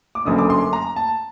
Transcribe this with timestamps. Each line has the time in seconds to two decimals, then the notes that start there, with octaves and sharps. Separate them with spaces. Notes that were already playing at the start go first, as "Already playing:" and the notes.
0.15 D6
0.25 F#1 F#2 D3 D#6
0.38 D6
0.50 C6
0.73 A#5
0.96 A5